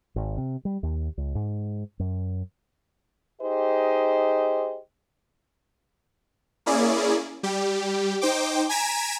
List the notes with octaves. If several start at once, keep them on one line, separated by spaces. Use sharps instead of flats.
G#1
C3
G3
D#2
C#2
G#2
F#2
D#4 G4 G#4 C5 D#5
A#3 C#4 E4 G#4 D5
G3 G4
D#4 C5 G5 D6
G#5 A#5 G#6 B6 D7 E7